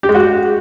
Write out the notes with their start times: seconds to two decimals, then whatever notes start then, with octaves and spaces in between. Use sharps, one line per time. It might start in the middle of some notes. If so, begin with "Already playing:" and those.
0.03 G4
0.09 G#3
0.15 F#4